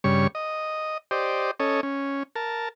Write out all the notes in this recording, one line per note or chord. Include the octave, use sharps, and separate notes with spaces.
G2 C#3 G3 C#5 C#6
D#5
G4 C5 D5 D#5
C#4 A4 C#5 D#5
C#4
A#4 A5